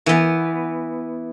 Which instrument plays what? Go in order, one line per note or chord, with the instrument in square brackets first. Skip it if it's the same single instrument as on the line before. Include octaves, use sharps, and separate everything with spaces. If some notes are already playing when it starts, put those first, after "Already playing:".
[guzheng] E3 B3